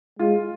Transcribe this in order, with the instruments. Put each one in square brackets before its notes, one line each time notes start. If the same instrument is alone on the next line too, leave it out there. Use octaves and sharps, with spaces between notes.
[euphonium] G#3 [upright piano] F4